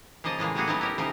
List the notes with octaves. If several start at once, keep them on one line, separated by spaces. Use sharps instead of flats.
C#3 F3 A#3 D#5 A5
A2 E3 G#3 A#3
G3 A3 A#3 C#4 F#4 G#4
F#3 A3 B3 D#4 E4
E4 G4 A#4
C#3 F3 A3 D#4 A#4